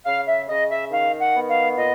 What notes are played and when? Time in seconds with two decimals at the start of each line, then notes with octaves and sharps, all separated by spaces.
0.06 C#3 F5
0.28 E5
0.49 C#3 D#5
0.70 E5
0.91 D#3 F5
1.20 F#5
1.35 B3
1.49 F5
1.77 A#2 D#5